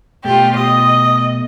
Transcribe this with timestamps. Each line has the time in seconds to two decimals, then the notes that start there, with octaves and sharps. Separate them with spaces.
0.25 B2 A3 F4 G4
0.57 D#5 D#6